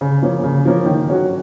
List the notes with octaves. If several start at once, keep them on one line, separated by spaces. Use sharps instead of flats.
C#3
F3 A#3 C#4
C#3
F3 A#3 C#4
D#3
F#3 C#4 F#4